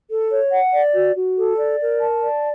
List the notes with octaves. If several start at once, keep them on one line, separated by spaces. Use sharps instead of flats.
A4
C#5
F#5
D5
F#4
F#4
A4
D5
A#4
A5
D5